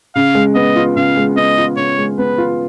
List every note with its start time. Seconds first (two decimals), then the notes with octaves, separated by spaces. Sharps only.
0.16 C#3 F5
0.35 G#3
0.55 B3 D#5
0.76 F4
0.96 C#3 F5
1.17 G#3
1.36 B3 D#5
1.58 F4
1.77 C#3 C#5
1.98 G#3
2.18 B3 B4
2.38 F4